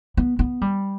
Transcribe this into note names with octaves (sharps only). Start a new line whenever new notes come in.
B3
B3
G3